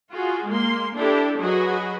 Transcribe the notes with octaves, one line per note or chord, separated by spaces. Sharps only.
F4 F#4 G#4
G#3 A#3 C6
D4 E4 G4 A4
F#3 F#4 G#4 B4 D#5